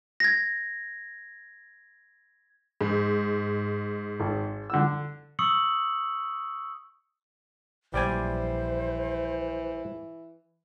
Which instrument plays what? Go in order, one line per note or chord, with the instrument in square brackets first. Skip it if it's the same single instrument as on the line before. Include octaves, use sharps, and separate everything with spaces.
[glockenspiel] G#6 A#6
[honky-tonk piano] G#2
[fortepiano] G#1
D3 E6
[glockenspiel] C#6 D#6 E6 C#7 F#7
[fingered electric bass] A#1 F#3 [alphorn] E3 [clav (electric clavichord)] G3 D5 G#5 [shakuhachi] C5